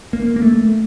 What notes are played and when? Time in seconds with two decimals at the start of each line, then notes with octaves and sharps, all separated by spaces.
0.13 A#3
0.36 A#3
0.42 A3